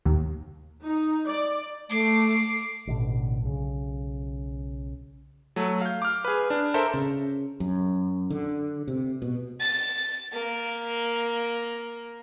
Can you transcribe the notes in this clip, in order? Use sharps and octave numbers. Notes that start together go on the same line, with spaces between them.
D#2
D#4
D5
A3 D6 C7
A1 B2 D3
B1 C#3
F#3 A3
F5 G6
D6 F6
G#4 B4
D4
A4 A#4 C5 E5
C#3
F#2
D3
C3
B2
A6
A#3